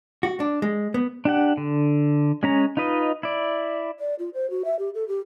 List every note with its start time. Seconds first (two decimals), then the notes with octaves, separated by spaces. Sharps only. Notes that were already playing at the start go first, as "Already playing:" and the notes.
0.23 F#4
0.40 D4
0.62 G#3
0.94 B3
1.25 D4 G4 F#5
1.57 D3
2.43 G#3 C#4 A#5
2.77 D#4 F4 B4 D#5
3.23 E4 D5
4.00 D5
4.19 F4
4.34 C5
4.50 F#4
4.65 E5
4.79 G4
4.95 A4
5.08 G4